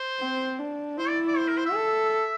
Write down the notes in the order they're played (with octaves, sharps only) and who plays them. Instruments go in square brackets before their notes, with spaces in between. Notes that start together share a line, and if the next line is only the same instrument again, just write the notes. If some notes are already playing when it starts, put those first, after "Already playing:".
Already playing: [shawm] C5
[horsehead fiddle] C4
D4
[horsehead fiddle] E4 [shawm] C5
[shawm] D5
D5
C5
A#4
C5
E5
[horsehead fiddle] A4